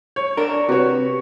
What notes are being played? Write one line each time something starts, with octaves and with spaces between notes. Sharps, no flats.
C#5
D4 A#4
C3 F#4 B4 C#5